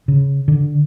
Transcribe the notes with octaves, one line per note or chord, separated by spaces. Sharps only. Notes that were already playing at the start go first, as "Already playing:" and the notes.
C#3
D3